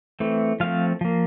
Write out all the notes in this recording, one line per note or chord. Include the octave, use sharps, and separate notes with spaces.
E3 A3 C4
F3 A3 C4 F5
F3 A#3